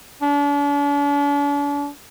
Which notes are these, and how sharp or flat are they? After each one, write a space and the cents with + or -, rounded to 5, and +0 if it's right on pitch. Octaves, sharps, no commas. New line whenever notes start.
D4 -40